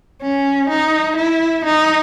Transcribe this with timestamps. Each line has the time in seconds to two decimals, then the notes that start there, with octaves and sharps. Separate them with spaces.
0.22 C#4
0.70 D#4
1.17 E4
1.65 D#4